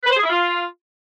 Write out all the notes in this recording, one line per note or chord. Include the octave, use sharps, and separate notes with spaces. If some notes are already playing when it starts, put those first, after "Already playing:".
B4
C5
G#4
E4
F4